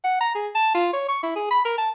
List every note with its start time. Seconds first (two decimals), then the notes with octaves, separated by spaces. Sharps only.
0.04 F#5
0.21 A#5
0.35 G#4
0.55 A5
0.74 F4
0.93 C#5
1.08 C#6
1.23 E4
1.36 G#4
1.51 B5
1.65 A#4
1.78 A5